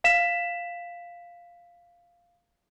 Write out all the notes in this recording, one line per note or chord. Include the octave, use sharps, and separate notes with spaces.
F5 B6 E7